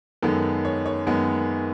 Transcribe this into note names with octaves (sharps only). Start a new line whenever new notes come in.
F#2 D#3 G#3 B3 A4
C#5
C#5
F#2 D#3 G#3 B3